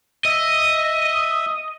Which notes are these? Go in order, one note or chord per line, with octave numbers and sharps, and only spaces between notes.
D#5 E5